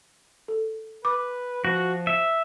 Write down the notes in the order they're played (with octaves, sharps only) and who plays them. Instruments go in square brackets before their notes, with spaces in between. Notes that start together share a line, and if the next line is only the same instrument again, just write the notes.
[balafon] A4
[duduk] B4 [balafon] D6
[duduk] F3 [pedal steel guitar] F#4
[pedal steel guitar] E5